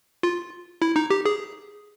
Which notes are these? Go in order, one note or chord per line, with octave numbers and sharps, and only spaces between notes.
F4
E4
D#4
G4
G#4